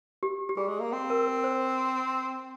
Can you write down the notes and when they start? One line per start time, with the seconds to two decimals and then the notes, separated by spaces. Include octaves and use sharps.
0.23 G4
0.49 G4
0.57 G3 G#4
0.68 G#3
0.80 A#3
0.93 C4
1.10 A#4
1.27 A#4
1.44 C5